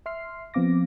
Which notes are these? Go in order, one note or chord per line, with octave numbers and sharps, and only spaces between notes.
E5 C6 F6 C7
F3 B3 C4 F5 D6 A#6